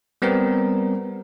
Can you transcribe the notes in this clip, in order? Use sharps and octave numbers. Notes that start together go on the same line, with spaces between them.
G3 B3 C4 A#4